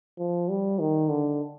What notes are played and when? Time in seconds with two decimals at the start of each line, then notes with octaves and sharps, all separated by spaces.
0.18 F3
0.49 G3
0.79 D#3
1.09 D3